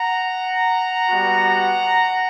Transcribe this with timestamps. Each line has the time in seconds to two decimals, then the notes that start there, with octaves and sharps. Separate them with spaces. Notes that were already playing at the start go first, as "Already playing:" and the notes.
Already playing: F#5 A#5
1.08 G3 B3 F#4